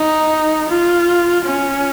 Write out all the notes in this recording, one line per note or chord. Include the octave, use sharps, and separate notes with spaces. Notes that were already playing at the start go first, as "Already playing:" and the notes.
Already playing: D#4
F4
C#4